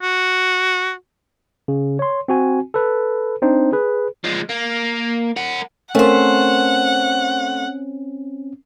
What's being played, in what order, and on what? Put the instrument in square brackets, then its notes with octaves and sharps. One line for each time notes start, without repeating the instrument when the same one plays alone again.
[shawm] F#4
[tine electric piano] C#3
C#5 C6
C4 F#4 G#5
A4 B4
C4 D4 D#4 C5
G#4 B4
[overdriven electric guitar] F3 G#3
A#3
A#4 F#5
[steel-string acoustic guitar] A3 C5 [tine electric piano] C4 C#4 [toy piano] A#4 F5 [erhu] F#5